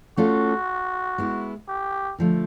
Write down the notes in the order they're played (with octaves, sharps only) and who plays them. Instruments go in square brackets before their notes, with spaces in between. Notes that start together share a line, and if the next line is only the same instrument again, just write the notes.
[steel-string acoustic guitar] A3 C#4 F4 A4 [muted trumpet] F#4
[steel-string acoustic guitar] G#3 B3 E4
[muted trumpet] G4
[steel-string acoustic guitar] D3 F3 A3